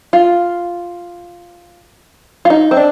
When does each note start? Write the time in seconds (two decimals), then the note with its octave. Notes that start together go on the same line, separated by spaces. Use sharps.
0.13 F4
2.45 F4
2.50 D#4
2.71 C4
2.77 D4